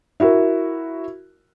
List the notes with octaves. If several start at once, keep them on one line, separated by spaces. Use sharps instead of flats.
E4 F#4 A#4